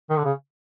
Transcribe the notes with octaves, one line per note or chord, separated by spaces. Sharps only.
D#3
D3
C#3